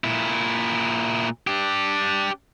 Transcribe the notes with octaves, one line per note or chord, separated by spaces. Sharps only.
A#2 E4
D4 G4